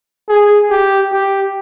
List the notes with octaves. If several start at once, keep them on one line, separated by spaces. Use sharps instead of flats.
G#4
G4
G4